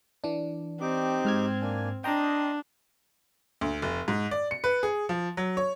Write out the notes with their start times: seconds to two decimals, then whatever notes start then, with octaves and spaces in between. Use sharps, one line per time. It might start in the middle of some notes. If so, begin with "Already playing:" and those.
0.24 E3 D4
0.81 C4 D#4 G4 D6
1.25 G#2 F6 G#6
1.61 A#3 D4 G#5
2.04 D4 D#5 G5 A#5 C6 D#6
3.61 D2
3.82 F1
4.08 G#2
4.31 D5
4.51 C#7
4.64 B4
4.83 G#4
5.09 F3
5.37 F#3
5.57 C#5